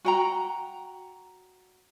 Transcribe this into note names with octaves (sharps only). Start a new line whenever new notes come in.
F#4 G5 A#5